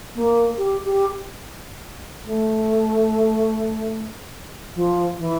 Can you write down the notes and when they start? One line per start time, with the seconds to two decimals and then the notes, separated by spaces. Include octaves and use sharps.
0.15 A#3
0.58 G4
0.86 G4
2.25 A3
4.75 F3
5.18 E3